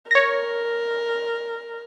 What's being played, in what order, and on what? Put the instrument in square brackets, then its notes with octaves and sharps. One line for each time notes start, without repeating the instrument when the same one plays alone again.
[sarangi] A#4 [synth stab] C#5 A#6